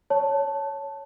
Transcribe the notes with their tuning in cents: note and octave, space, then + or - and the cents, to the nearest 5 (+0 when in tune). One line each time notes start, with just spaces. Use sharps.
C#5 +0 A5 +0